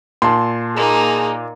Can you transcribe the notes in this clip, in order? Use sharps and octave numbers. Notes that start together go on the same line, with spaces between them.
A#2 A5 C6
A#3 D#4 G#4